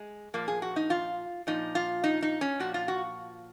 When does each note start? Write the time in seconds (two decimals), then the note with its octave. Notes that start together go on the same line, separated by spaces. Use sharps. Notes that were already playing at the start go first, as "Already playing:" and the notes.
Already playing: G#3
0.34 A#2 F3 A#3
0.48 G#4
0.62 F#4
0.76 D#4
0.90 F4
1.47 A#2 F3 D#4
1.75 F4
2.04 D#4
2.23 D#4
2.41 C#4
2.60 A#2 F3 F#4
2.74 F4
2.88 F#4